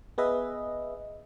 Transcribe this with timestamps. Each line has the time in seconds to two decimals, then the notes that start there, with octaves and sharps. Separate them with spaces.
0.18 B3 G#4 B4 D#5 E5